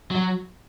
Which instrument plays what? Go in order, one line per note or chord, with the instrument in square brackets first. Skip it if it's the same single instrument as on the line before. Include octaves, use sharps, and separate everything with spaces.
[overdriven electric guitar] F#3